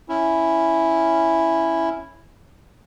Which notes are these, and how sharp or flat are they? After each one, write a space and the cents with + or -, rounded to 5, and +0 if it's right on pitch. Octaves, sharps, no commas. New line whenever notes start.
C#4 +0 E4 +0